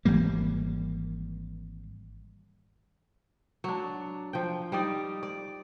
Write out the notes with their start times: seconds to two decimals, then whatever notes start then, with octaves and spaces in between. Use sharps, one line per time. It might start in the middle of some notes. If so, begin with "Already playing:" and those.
0.05 G#1 E3 G3 A#3
3.64 F#3 D4
4.33 F3 G5
4.72 G3 D#4 D5
5.23 D5